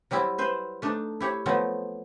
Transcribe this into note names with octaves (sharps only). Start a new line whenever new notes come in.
F#3 G3 C4 E4
B4 C5 E5
A3 D4 D#4
E4 G4 C#5
F3 F#3 A3 B3 C4